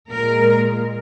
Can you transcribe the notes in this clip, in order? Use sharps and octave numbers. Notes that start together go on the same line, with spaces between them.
A#2 G#3 A#4